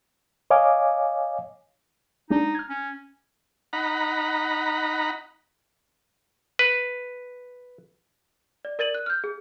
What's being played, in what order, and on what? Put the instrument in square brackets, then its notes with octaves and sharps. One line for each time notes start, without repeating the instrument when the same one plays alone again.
[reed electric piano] C#5 D#5 F5 G#5 D6
[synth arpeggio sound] G#3 D4 [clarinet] D#4
[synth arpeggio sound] F6 G#6
[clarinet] C#4
[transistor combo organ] D#4 F#5 A#5 B5
[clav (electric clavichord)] B4
[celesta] D5
A#4 D5 A6 D#7 F#7
F#6
F6 G6
G#4